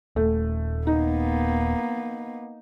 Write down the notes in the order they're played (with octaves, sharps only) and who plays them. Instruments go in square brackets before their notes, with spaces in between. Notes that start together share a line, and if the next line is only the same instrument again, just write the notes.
[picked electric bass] D#1 [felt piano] A3
[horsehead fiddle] A#3 B3 [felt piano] D#4